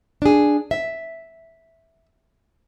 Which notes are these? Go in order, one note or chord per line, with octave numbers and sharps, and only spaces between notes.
D4 G#4
E5